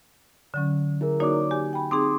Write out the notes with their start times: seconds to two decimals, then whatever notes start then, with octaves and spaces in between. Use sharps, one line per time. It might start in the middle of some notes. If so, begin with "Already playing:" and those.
0.54 D3 F#3 C#4
1.01 E4 G#4 A#4
1.20 A#3 D#4 F#4 C#5 D5 D6
1.51 G4 G#5
1.73 G5 B5
1.91 C4 D#4 G#4 C6 D6 D#6